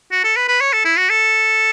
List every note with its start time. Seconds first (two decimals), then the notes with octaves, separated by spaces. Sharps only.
0.12 F#4
0.24 A4
0.37 B4
0.49 B4
0.61 C#5
0.73 A4
0.85 E4
0.97 F#4
1.10 A4